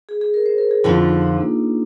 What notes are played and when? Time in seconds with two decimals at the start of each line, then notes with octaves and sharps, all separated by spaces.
0.09 G#4
0.21 G#4
0.34 A#4
0.46 C5
0.58 A#4
0.71 G#4
0.84 F2 D3 F3 F4
0.96 D#4
1.09 D#4
1.21 D4
1.40 A#3